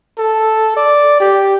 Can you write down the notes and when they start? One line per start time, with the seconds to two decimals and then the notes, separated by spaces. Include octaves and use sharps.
0.18 A4
0.77 D5
1.21 G4